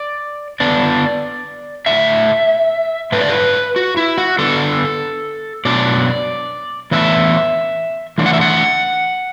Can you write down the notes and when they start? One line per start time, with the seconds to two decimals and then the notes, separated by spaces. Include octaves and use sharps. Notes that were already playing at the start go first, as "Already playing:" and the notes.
Already playing: D5
0.60 D3 B3 D4 D5
1.86 A2 A3 D4 E5
3.12 A2 A3 D4 B4
3.21 D5
3.29 B4
3.76 F#4
3.97 E4
4.18 F#4
4.39 D3 B3 D4 A4
5.65 B2 F#3 D4 D5
6.91 A2 E3 B3 D4 E5
8.18 E3 A3 D4
8.26 F#5
8.33 E5
8.41 F#5